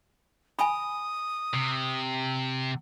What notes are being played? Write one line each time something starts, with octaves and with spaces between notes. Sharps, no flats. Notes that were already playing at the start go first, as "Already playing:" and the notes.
G#5 B5 D#6
C3